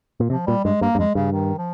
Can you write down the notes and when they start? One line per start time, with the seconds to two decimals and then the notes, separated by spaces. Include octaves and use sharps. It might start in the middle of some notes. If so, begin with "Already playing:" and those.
0.20 A#2
0.30 C3 F3
0.47 A#2 G3
0.64 G2 G#3
0.81 G2 A#3
0.95 G2
0.99 F2 G#3
1.15 G2 C#3
1.33 D#3
1.58 F3